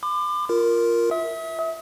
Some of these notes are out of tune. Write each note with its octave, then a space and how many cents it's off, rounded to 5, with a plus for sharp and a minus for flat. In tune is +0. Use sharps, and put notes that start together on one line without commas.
B5 +45 D6 +30
F4 +0 A#4 +0
E5 -15 D#6 +40